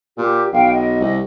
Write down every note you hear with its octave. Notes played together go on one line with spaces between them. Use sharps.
A#2 G4
B1 F5 G5
D#5
C2